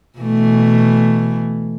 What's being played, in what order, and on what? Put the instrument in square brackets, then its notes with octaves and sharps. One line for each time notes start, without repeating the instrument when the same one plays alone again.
[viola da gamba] B2 E3 A3